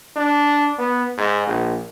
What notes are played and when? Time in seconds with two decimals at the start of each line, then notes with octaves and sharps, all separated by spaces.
0.16 D4
0.79 B3
1.18 G#2
1.47 A#1